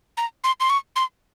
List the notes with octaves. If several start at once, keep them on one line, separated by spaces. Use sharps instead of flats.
A#5
C6
C6
C#6
C6